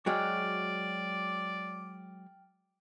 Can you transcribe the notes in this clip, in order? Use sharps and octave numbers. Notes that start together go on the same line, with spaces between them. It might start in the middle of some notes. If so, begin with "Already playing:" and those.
F#3 G#3 F#4 D5 G5 D6 F6